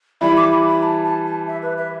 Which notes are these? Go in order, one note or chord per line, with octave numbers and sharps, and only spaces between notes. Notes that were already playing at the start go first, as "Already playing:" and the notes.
E3 G3 E4 B5
D6
B5
B5
A5
A5
A5
E5
B4
E5